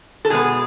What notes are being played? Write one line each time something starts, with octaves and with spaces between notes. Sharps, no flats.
A4
B2 G#3 B3 G#4